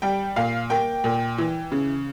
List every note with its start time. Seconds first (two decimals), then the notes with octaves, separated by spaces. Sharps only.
0.02 G3 G5
0.36 A#2 F5
0.70 A#3 G5
1.04 A#2
1.38 E3
1.72 C#3